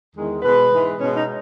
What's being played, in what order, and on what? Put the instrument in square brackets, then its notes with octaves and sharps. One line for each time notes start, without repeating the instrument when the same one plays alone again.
[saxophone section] E2 D#3 G#3
B2 G#3 B4
G#2 E3 G#3
B2 G#3 C#4
D#4